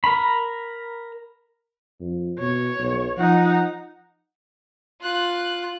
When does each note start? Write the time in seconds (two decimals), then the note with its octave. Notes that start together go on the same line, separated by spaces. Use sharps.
0.04 A#4 A#5 B5
2.00 F2
2.39 B2 C#5
2.79 B1
3.18 F3 D#4 F#5
5.01 F4 F#6